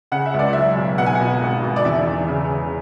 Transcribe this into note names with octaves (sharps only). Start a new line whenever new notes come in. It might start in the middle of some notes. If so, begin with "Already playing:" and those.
C#3 F#5
E5
C#2 D5
F#3 E5
B1
B2 F#5
G#5
B2 F#5
G#1
G#1
D5
E2 E5
E2
C#3
C#3